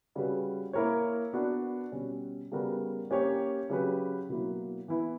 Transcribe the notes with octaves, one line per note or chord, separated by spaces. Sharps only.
C#3 G3 C#4 F#4 B4
A#3 E4 A#4 C#5
B3 D4 F#4 B4
B2 G3 C#4
C#3 G3 B3 F#4 A#4
A#3 C#4 G4 C#5
C#3 F#3 C#4 G4 B4
B2 F#3 A#3 E4
E3 B3 E4